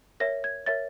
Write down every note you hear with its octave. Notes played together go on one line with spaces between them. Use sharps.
A#4 C#5 E5 A#6
G#6
A#4 C#5 E5 A6